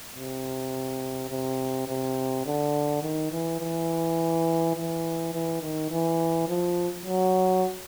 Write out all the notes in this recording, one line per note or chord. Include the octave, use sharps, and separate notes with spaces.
C3
C3
C3
D3
D#3
E3
E3
E3
E3
D#3
E3
F3
F#3